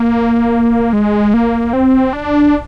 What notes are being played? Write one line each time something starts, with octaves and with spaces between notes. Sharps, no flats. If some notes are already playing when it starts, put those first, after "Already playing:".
Already playing: A#3
G#3
A#3
C4
D4